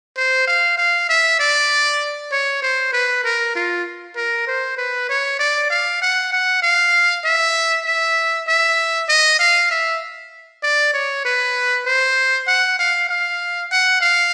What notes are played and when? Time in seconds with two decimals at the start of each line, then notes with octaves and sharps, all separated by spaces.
0.17 C5
0.47 F5
0.78 F5
1.09 E5
1.39 D5
2.32 C#5
2.62 C5
2.93 B4
3.24 A#4
3.55 F4
4.16 A#4
4.47 C5
4.78 B4
5.09 C#5
5.39 D5
5.70 F5
6.02 F#5
6.33 F#5
6.62 F5
7.24 E5
7.85 E5
8.48 E5
9.09 D#5
9.39 F5
9.71 E5
10.63 D5
10.94 C#5
11.25 B4
11.86 C5
12.47 F#5
12.79 F5
13.09 F5
13.71 F#5
14.01 F5